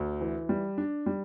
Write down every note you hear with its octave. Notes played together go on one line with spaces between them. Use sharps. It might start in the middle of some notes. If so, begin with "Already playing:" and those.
Already playing: D2
E3
G3
D4
G3